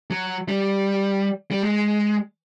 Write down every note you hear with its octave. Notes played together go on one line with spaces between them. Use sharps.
F#3
G3
G3
G#3